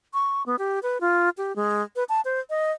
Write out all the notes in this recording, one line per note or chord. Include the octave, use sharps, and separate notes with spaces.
C#6
B3
G4
B4
F4
G4
G#3
B4
A5
C5
D#5